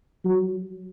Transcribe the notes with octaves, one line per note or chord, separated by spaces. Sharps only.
F#3